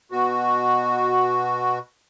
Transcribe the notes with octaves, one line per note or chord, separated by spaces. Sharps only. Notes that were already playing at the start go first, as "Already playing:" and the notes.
B2 F#4